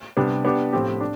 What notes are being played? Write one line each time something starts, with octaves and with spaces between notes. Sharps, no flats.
C3 G3 B3 D4
B3 D4 G4
A2 F3 C4 G4
D4